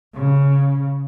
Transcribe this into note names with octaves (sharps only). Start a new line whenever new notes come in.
C#3